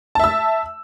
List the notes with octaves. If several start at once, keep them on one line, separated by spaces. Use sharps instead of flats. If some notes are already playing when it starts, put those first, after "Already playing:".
E5 A5 E6